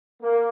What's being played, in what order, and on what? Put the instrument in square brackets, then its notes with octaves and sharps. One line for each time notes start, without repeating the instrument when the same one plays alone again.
[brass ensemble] A#3